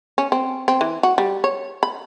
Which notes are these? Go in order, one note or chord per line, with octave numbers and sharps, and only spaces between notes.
C#4
C4
C4
E3
F#4
G3
C#5
B5